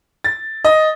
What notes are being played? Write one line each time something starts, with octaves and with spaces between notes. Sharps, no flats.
A6
D#5